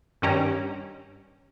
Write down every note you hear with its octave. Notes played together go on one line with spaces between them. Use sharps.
G2 D#3 C#4 G4 A#5